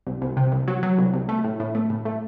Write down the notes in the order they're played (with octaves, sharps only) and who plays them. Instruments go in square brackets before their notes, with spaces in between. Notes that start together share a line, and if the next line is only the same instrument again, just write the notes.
[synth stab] C2
C2
C3
C2
F#3
F#3
C2
C2
A3
A2
A2
A3
A2
A3